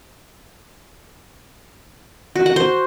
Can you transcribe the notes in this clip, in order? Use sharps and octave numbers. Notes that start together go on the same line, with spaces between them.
F#4
F#5
C5